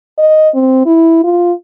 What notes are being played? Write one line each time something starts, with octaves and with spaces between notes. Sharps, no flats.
D#5
C4
E4
F4